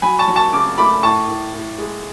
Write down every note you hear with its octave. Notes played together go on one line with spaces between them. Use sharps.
F#3 G#5 B5
A5 C#6
F#3
A5 C#6
C#3 D6
A3 B5 D6
A2 A5 C#6
A2
A2
G#3